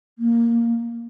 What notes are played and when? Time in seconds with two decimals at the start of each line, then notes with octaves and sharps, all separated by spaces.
0.19 A#3